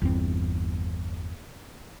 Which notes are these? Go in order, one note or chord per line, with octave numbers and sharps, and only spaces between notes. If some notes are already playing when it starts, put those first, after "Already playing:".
G1 E2 C4